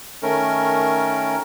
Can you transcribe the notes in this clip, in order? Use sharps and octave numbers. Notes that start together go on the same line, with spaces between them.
D#3 A3 C#4 A#4